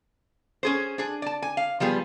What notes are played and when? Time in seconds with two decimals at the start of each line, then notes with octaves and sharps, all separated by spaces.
0.63 C#4 G#4 C5
0.98 D4 G#4
1.22 D5 A5
1.42 G#5
1.57 F5
1.80 F3 G3 B3 G#4